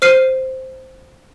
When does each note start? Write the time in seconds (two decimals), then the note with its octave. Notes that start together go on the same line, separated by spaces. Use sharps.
0.02 C5 F6 C7 D#7